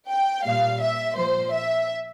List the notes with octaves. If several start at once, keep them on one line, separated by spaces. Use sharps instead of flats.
G5
A#2 G3 F5
E5
A#2 F3 C5
E5